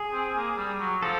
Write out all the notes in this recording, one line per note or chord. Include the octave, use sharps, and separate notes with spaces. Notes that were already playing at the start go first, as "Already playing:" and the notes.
Already playing: G#4
C4
A#3
G3
F#3
F3 A4